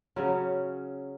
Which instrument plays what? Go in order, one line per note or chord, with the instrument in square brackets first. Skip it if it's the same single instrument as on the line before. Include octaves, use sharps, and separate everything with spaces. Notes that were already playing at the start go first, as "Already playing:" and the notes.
[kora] C#3 F#3 C#4